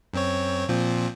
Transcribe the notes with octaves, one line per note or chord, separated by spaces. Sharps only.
F#2 C4 C#5
A#2 F3 C4